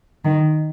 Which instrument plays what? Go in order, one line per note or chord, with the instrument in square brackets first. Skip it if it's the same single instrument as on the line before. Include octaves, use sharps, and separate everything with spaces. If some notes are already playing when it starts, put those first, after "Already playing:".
[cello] D#3